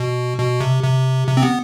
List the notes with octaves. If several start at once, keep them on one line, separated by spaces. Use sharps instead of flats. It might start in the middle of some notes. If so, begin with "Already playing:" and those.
Already playing: B2
B2
C3
C3
C3
C4
B3